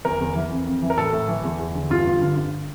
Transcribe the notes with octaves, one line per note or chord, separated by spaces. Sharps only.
E2 A#4
E2
E3
F2
F2
E3
A#4
A2 A4
A2
E3
E2
E2
D3
G2 F4
G2
D3
G2